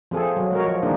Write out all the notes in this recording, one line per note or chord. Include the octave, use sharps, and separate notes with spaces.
F3 C4 G#4 A4
F#3
G#3 F#4 A#4 C#5
F3
D#3 E3 G#3 A#3 D4 D#4